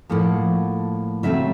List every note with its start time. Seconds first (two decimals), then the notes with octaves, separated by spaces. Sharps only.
0.09 A2 F3 A#3 F#5
1.23 C#3 F#3 A3 C4 E5